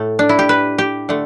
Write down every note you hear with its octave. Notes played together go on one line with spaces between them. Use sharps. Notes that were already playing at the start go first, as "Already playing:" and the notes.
Already playing: A2 A3
D4
E4
G4
B4
G4
D3 A3